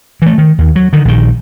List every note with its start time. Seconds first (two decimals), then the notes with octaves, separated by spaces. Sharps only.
0.22 E3 A3
0.38 D#3
0.59 D#2
0.76 F#3
0.93 D3 D#3
1.05 A#1 D#3